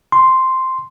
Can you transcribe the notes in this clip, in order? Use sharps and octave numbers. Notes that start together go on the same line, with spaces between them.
C6